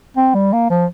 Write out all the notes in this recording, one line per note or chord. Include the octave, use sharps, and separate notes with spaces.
C4
G3
A#3
F3